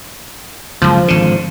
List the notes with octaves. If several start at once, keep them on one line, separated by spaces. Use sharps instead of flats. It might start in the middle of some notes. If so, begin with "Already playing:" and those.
F#1 C#2 F3
G#1 D3